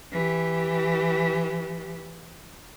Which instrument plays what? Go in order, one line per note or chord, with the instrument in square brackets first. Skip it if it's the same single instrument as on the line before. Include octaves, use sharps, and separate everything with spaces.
[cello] E3 G4